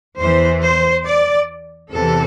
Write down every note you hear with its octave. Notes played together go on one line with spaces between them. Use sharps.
E2 E3 C5
C5
D5
E2 C3 E3 A4